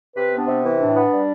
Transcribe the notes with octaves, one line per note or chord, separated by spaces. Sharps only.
C3 B4
B3
D4
C3
E3
A2 D4
B3
G3